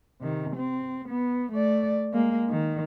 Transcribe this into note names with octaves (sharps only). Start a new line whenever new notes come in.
C3 D#3
C4
B3
A3 D5
G#3 A#3
D#3